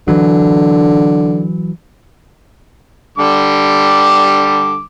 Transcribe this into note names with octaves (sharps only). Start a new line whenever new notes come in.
D3 E3 F#3
D3 G3 D6